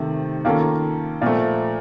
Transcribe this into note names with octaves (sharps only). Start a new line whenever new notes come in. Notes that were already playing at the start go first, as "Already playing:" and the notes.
Already playing: C3 D#3 A3
D#3 A#3 C#4 F4 A4
A#2 F3 A3